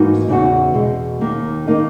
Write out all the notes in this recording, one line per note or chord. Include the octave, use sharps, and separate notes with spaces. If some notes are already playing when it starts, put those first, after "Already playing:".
Already playing: G#2 E3 A#3 D#4 F#4
E2 C#3 E3 B3 F#4
E2 B2 G#3
D#2 D#3 A#3
D#3 A#3 D#4